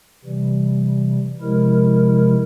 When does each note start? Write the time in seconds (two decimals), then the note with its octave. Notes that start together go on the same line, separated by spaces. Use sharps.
0.24 C3 E3 G3
1.41 C3 F3 G#3 E4 A#4